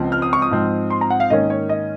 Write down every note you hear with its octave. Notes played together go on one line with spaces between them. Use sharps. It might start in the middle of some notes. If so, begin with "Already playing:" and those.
Already playing: C#2 C#3 F3 C4
F6
D#6
C#6
D#6
G#2 F3 C4
C6
A#5
F#5
F5
G#2 D#3 A#3 C#4 D#5
C#5
D#5